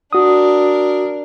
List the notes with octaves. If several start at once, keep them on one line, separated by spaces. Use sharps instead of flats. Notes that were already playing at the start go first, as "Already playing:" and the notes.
D4 F#4 A#4 D#6